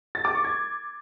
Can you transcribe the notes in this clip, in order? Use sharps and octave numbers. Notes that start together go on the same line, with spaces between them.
A6
D6
C#6
G#6